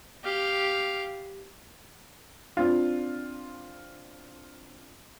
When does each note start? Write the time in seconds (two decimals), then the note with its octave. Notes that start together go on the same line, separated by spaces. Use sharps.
0.24 G4 F5
2.57 C4 D4 F4